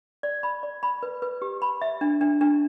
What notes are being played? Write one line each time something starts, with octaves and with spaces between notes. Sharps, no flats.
D5
B5
D5
B5
B4
B4
G4
B5
E5
D4
D4
D4